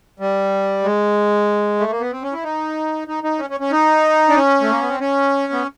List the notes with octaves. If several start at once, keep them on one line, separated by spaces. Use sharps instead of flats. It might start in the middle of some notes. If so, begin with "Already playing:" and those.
G3
G#3
A3
A#3
B3
C4
C#4
E4
D#4
D#4
D#4
C#4
C#4
C#4
D#4
D4
C#4
A3
A#3
B3
C4
C#4
B3